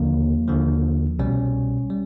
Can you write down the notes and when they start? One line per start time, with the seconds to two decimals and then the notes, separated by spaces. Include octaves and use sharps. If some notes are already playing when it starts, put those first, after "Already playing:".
Already playing: D#2 D3 F3 A#3
0.48 D#2 D3 F3
1.19 C2 B2 G3 C#4
1.90 G3